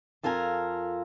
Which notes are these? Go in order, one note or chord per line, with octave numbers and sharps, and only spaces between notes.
F2 F4 A4 A#4 G#5